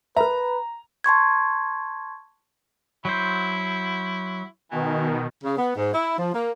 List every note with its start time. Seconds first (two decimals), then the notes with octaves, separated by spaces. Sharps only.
0.17 A#4 B4 E5 A#5
1.04 A5 C6 C#6 G#6
3.05 F#3 E4 C5
4.71 B2 D#3 E3
5.44 C#3
5.58 B3
5.76 G#2
5.93 E4
6.18 F3
6.34 A#3